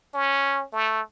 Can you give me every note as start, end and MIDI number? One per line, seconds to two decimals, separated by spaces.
0.14 0.64 61
0.73 1.01 57